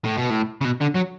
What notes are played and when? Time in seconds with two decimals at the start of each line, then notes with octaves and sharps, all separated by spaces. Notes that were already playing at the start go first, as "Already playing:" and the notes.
0.04 A2
0.17 B2
0.30 A2
0.61 C#3
0.65 B2
0.81 D3
0.96 F#3